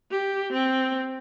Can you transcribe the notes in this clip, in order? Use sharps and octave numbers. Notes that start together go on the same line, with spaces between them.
G4
C4